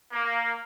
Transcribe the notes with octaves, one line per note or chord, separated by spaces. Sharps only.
A#3